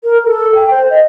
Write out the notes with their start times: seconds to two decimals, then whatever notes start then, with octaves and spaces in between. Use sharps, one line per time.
0.03 A#4
0.25 A4
0.54 G5
0.70 C5
0.89 D#5